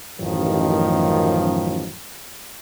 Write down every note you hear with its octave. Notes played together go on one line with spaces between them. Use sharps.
A1 F#2 D#3 F3